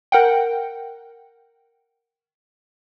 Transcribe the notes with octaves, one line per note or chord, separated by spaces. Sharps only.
A#4 F#5 G5